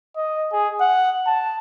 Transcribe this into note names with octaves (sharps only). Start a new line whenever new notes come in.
D#5
G#4
F#5
A5